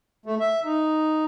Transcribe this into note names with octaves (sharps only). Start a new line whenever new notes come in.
A3
E5
D#4